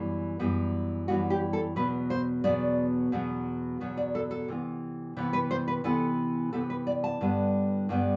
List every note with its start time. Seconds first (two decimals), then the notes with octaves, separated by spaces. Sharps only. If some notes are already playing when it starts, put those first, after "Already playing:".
Already playing: F#2 E3 G3 B3
0.39 F#2 E3 G3 B3
1.08 F#2 E3 G3 B3 F#4
1.30 G4
1.53 A4
1.76 E2 B2 F#3 B3 B4
2.10 C5
2.44 E2 B2 F#3 B3 D5
3.12 E2 B2 F#3 B3
3.80 E2 B2 F#3 B3
3.97 D5
4.15 A4
4.31 A4
4.48 C3 E3 B3
5.17 C3 E3 B3
5.33 B4
5.51 C5
5.68 B4
5.84 C3 E3 B3 A4
6.53 C3 E3 B3 A4
6.70 B4
6.87 D5
7.04 A5
7.21 G2 D3 G3 B3
7.89 G2 D3 G3 B3